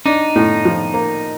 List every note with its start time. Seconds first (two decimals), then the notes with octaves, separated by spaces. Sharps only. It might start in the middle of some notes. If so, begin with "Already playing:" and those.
0.05 D4 D#4
0.36 A2
0.65 F3
0.94 A#3